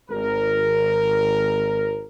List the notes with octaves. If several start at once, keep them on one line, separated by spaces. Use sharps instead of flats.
G#1 A#4